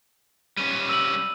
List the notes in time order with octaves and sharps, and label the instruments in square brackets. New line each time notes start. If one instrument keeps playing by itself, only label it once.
[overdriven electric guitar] G3 C#4 [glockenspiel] D#7
[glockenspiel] E6 D#7 F#7